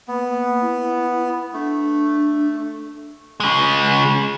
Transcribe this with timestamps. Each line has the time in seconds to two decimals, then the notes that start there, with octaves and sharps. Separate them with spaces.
0.08 A#3 B3
0.61 E4
1.53 A3 D4
3.40 C#3 G#3